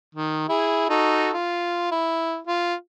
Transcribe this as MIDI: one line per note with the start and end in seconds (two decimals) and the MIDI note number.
0.15 0.48 51
0.49 0.89 64
0.49 0.89 68
0.89 1.31 63
0.89 1.31 66
0.89 1.31 69
1.34 1.90 65
1.92 2.38 64
2.47 2.75 65